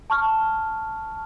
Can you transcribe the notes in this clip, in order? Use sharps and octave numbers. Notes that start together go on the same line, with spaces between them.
A5 C#6 F6